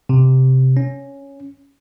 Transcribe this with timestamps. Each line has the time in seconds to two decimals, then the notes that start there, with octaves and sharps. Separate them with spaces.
0.09 C3
0.77 C#4